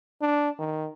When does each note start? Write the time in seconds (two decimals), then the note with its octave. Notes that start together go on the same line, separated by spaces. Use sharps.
0.21 D4
0.59 D#3